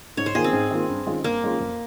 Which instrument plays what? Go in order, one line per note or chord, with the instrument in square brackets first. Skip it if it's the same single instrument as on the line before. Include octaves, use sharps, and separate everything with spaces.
[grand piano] G#2 [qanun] C#5
[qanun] C5
[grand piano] D#3 A#3 F4 [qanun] G#4
[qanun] C4
[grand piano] G#2
D#3 A#3 F4
G2
D#3 G#3 C#4 F4
[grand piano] G2 [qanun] A#3
[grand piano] D#3 G#3 C#4 F4
F2